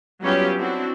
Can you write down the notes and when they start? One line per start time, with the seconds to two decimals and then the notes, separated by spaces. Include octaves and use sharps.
0.21 F#3 G3 B3 C#4 F4 G4
0.57 C4 D4 E4 F#4